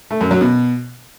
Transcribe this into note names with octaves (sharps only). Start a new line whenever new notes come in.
A3
F#2
F#3
B2